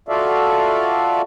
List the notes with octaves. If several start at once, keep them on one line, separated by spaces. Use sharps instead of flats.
F4 F#4 A4 D5 E5 F5